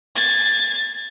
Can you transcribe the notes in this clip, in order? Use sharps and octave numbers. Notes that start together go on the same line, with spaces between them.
G#6 A6